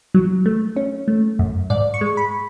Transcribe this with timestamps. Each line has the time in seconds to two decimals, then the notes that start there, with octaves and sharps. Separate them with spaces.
0.14 F#3
0.46 A3
0.76 C#4
1.08 A3
1.39 F#2
1.70 G#2 D5
1.94 C#6
2.01 G#3
2.17 B5